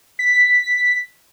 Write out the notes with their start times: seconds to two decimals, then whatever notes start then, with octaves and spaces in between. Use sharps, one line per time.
0.19 B6